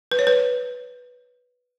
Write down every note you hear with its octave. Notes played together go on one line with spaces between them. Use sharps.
B4
C#5
B4